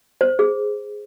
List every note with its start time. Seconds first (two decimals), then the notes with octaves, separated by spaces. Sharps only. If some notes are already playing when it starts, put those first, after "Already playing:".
0.21 C5
0.39 G#4